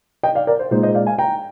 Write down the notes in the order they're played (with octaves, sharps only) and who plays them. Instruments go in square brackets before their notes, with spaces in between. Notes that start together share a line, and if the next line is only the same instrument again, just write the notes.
[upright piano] D#5 G5
D5 F5
A#4 D5
C5
A#2 G#3 D#4 C5
C5 D#5
D5 F5
F5 G#5
G5 A#5